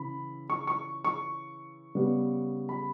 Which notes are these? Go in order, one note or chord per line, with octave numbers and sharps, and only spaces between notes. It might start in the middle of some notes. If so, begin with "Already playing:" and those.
Already playing: C#3 E3 B5
C#6
C#6
C#6
C#3 G3 B3
B5